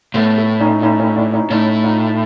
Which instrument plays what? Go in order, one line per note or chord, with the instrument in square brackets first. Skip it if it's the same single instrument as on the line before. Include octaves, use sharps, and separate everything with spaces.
[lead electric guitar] A2 [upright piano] A3 B3
[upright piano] A3
C#4 D#4
C#4 D#4
C#4 D#4
D4 E4
C#4 D#4
[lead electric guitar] A2 [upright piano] C#4 D#4
[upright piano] D#4 F4